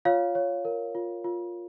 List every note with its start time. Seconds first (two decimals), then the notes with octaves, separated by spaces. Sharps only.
0.05 F4 C#5 F5
0.35 C#5
0.65 A#4
0.95 F4
1.24 F4